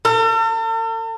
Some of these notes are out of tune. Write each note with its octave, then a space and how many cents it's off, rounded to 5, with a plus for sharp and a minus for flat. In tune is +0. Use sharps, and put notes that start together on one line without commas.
A4 +45